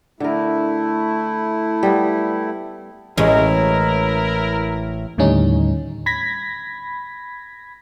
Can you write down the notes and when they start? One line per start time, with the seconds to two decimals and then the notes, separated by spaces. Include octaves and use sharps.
0.20 D3 A3 E4 A#4
1.83 G3 B3
3.17 A1 G#3 C#4 E4 A#4
5.18 D#2 A2 D3 G3 C#4 D#4
6.06 B5 G#6 A#6 B6